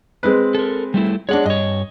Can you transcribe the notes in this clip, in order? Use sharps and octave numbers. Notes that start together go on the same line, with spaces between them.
G#3 C4 B4
A4 A#4
G3 A3 E4
G#3 D4 C#5 F#5
G2 C#5 D#5